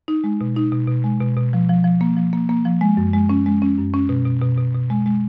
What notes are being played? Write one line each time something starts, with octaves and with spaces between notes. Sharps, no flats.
D#4
G#3
B2
D#4
B2
B2
G#3
B2
B2
F3
F3
F3
A#3
F3
A#3
A#3
F3
G#3
F#2
G#3
C#4
G#3
C#4
F#2
C#4
B2
B2
B2
B2
B2
G#3
G#3